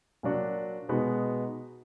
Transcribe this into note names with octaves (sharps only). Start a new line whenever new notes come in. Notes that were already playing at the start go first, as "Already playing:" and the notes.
A#2 F#3 D4 F#4
B2 G#3 B3 D#4 F#4